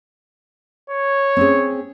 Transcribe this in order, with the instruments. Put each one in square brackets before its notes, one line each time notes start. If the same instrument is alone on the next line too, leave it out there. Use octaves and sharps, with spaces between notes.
[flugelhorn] C#5
[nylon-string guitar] C4 C#4 G#4